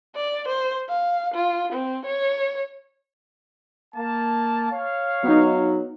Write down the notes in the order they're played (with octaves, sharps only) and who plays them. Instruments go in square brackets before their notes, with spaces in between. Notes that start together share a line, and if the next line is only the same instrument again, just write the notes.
[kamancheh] D5
C5
F5
F4
C4
C#5
[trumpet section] A#3 A5
C#5 F5
[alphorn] F#3 [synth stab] B3 D#4